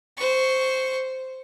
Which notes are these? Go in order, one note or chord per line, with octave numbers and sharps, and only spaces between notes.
C5 C#6